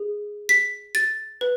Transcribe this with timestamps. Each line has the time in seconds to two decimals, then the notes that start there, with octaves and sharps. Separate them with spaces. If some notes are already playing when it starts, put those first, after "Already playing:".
Already playing: G#4
0.49 B6
0.95 A6
1.41 B4